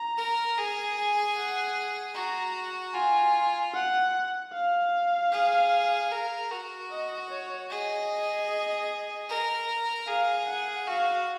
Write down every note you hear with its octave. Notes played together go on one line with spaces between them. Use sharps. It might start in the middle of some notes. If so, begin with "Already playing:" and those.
Already playing: A#5
A#4
G#4 G#5
G#5
F#5
F#4 A#5
F4 G#5
F#5
F5
G#4
A#4
F#4
D#5
C#5
G#4 D#5
A#4
G#4 F5
F#5
F#4 F5